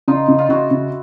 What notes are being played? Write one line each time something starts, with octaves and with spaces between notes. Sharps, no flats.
C#3 D#4 F4
C#3
F4
C#3 E4 F#4
C#3